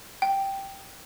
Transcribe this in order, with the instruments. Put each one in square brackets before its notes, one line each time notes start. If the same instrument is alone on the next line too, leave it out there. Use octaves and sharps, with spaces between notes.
[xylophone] G5